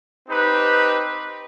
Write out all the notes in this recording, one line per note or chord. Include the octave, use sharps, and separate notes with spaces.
C4 D#4 G4 B4